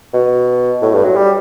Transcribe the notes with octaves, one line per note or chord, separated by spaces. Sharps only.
B2
A2
G2
F#3
G3